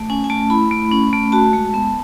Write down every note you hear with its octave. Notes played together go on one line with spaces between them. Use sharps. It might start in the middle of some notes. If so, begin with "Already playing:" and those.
Already playing: A3
C#4 G#5
G#5
A3 A5
E4 B5
A3
C#4
A3
F#4 A5
G#3
B3